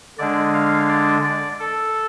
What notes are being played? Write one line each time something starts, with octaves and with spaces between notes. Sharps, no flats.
D3 G#3 D4 D5
F5
D5
D5
A4